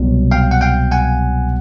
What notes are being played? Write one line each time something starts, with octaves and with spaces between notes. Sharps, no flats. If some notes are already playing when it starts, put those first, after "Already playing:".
Already playing: C2 B2 F#3
F5 G5
F#5
F5 G5
F#5 G#5